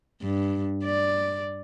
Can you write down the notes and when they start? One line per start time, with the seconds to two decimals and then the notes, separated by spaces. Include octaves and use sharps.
0.22 G2
0.84 D5